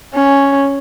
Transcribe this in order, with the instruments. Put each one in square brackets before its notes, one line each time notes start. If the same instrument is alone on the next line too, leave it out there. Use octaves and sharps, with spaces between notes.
[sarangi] C#4